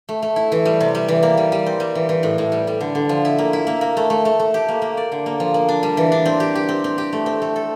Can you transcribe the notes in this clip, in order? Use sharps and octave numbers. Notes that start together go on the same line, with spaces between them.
A3
A3
E4
E3
G3
C3
G3
E3
A#3
G3
G3
C4
G3
E3
E3
A2
A2
G3
G3
D3
D3
F3
E4
A#3
E4
A#3
A#3
A3
A3
A3
A3
G4
A#3
A#3
D5
D3
A#3
F3
A#3
D4
G3
E3
D4
C4
G4
G4
C4
C4
G4
A3
C4
A3
A4